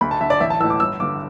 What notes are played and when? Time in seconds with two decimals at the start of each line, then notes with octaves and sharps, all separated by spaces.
0.01 D2 B5
0.11 A5
0.21 D3 E5
0.30 D5
0.40 A1 E5
0.50 A5
0.60 E3 E6
0.64 A2
0.70 D6
0.80 G1 E6
1.00 G2 D3 D6